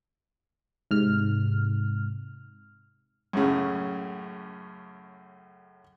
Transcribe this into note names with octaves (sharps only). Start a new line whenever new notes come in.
G#2 C3 F6
F#2 A2 C#3